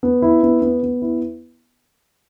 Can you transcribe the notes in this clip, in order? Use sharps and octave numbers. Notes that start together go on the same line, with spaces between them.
B3
E4
B3
B3
B3
E4